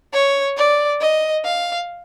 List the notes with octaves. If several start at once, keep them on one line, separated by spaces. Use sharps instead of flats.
C#5
D5
D#5
F5